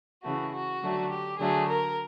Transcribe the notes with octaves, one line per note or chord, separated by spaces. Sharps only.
C#3 E3 A3 F#4
F#4
D3 F#3 A3
G4
D3 F#3 A3 G#4
A#4